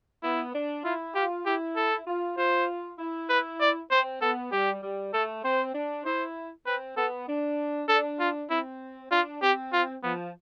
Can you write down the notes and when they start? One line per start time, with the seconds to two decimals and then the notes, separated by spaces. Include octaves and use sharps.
0.23 B3 E4
0.54 D4
0.85 E4 F4
1.15 F4 G4
1.46 E4 G4
1.77 A4
2.07 F4
2.38 F4 C5
2.99 E4
3.30 B4
3.61 D5
3.91 C4 C5
4.22 B3 A4
4.52 G3 G4
4.83 G3
5.13 A3 A4
5.44 C4 C5
5.74 D4
6.05 E4 C5
6.66 C4 B4
6.97 B3 A4
7.28 D4
7.89 D4 A4
8.20 F4
8.50 C4 E4
9.11 D4 F4
9.42 C4 G4
9.73 F4
10.03 F3 B3